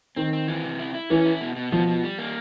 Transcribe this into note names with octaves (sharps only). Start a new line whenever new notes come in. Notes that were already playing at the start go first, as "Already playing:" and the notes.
D#3 C4
C4
E3
C3
E4
E4
E3 C#4
E4
B2
B2
B2 F3
B2
G3
A#3